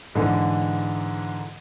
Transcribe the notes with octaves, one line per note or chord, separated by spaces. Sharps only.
G#2 D3 E3